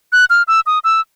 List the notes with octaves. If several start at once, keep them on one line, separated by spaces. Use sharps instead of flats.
F#6
F6
E6
D#6
E6